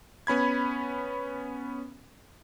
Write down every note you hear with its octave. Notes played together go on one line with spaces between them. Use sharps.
B3 C#4 B5 G#6